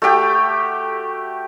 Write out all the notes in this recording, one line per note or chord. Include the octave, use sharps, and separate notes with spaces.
A3 F#4 G4 G5